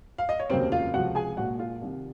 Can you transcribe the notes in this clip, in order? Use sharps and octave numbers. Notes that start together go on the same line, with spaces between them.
F5
D#5
C#5
F1 D#2 C#3 F#3 A#3 C4 C5
F4 F5
C#2 C3 F3 F#4 F#5
G#4 G#5
A#1 A#2 G#3 F#4 F#5
F4 F5
C2 C3 D#3